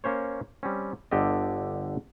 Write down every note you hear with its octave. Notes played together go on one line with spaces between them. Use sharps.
A#3 C#4 C5 C#5
G3 C4 C#4
G1 D3 G4 A4 D#5